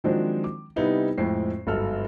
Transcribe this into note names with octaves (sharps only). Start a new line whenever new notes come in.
D#3 F3 F#3 G#3 C4 D4
D6
C3 G3 B3 D#4 E4
F2 A2 G#3 C4 C7
G1 G#2 F#3 A4 F6